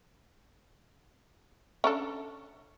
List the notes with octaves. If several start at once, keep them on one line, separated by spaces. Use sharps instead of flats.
C#4 D4 A4